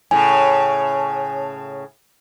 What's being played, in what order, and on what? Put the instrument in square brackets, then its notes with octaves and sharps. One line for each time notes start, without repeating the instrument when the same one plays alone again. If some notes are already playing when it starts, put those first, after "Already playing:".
[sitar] A2 C#3 [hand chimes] G#5